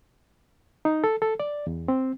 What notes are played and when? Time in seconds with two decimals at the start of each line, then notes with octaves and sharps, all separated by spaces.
0.85 D#4
1.04 A4
1.22 A4
1.40 D5
1.67 E2
1.88 C4